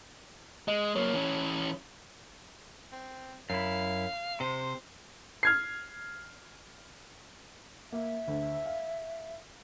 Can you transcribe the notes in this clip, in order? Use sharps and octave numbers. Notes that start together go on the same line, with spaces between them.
G#3 D#5
F#3 A#3 C#5
E3 C#4
C4
F#2 E4 F5
C3 C5
F6 G#6 C7
A#3 E5
D2
F5